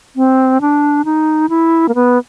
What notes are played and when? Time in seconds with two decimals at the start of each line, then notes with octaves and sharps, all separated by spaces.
0.16 C4
0.61 D4
1.05 D#4
1.49 E4
1.89 A#3
1.95 B3